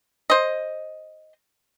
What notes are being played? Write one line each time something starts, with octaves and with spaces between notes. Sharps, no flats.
C5 D#5